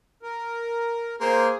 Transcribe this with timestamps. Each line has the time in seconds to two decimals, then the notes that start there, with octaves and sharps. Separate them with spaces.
0.23 A#4
1.21 A#3 G#4 C5